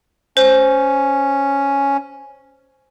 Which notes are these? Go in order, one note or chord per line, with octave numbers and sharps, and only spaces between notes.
C#4 C5